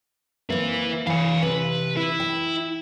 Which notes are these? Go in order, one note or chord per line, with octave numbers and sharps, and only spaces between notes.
A#3 C4 E4 B4
E3 F5 G#5
C3 B4
E4
G5